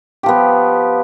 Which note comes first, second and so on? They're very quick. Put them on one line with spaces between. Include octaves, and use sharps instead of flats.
G4 F3 B3